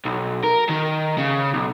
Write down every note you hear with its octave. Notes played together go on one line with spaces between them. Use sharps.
B1
A#4
D#3
C#3
B1